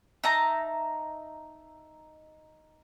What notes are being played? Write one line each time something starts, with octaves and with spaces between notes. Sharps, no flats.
D#4 E5 A5 A#5